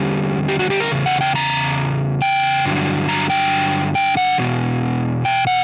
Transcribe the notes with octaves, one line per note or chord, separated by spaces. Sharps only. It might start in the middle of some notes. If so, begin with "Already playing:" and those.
Already playing: E2 D3 G3 C#4 G4
G4
F#4
G4
A#4
E2 C#3
F#5
G5
A#5
G5
G2 D3 F#3
A#5
G5
G5
F#5
E2 B2
G5
F#5